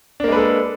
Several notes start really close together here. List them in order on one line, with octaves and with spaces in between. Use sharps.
D4 A#3 G#3 B4 A4